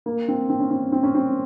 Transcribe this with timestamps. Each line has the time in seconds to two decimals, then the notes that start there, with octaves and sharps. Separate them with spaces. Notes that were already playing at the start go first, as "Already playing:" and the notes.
0.06 A#3
0.28 C4
0.50 C4
0.60 C#4
0.71 C4
0.92 C4
1.03 C#4
1.15 C4